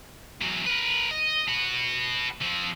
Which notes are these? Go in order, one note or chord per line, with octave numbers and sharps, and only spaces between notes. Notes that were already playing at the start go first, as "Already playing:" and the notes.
E2 F#3
A#4 B4
D#5
F#4 B4
F3 C4